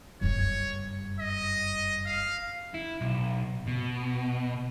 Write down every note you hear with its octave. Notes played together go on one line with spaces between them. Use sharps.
F#1 G2 C#5
D#5
F5
E4
B1
B2